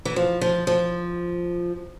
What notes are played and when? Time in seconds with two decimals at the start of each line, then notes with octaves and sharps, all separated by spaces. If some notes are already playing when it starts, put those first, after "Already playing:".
0.05 E3
0.16 F3
0.41 F3
0.67 F3